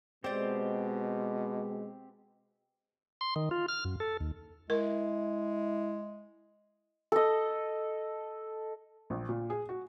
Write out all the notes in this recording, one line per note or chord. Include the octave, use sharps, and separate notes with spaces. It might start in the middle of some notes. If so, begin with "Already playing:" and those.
B2 G#3 C4 G4 C5 D5
C6
D#3
F4
F6
F#2
A4
D#2
G#3 E4 A#4
A4 D#5
A#1
A#2
G#4
F#4